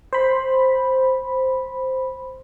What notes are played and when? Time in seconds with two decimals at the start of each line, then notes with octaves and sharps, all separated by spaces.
0.13 C5 B5